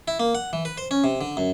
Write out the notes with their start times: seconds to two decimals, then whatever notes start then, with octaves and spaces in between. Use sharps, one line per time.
0.08 E4
0.20 A#3
0.35 F#5
0.53 E3
0.65 B4
0.78 C5
0.91 C#4
1.04 C3
1.21 D3
1.37 F#2